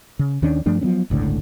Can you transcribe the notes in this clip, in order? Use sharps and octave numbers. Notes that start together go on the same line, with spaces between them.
C#3
D#2 D#3 C#4 D4
G2 F3 A3 D4
F3 F#3 B3 C#4
G1 C#2 A2 D3